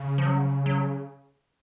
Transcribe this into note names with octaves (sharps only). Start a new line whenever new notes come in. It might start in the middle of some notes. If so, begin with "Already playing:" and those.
Already playing: C#3
F3
F#3
F#3